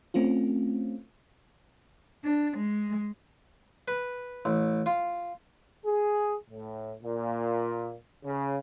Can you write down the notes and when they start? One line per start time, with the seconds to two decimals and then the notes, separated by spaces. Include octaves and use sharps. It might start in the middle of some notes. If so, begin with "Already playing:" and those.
0.14 A3 C4 C#4 F4
2.24 D4
2.57 G#3
3.88 B4
4.45 A1
4.86 F4
5.85 G#4
6.50 A2
7.03 A#2
8.24 C#3